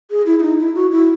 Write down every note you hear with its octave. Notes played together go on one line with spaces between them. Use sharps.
G#4
E4
E4
D#4
E4
F#4
E4